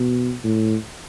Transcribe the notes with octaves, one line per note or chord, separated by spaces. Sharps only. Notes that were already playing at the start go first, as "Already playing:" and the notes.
Already playing: B2
A2